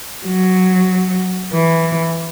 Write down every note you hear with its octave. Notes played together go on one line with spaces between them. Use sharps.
F#3
E3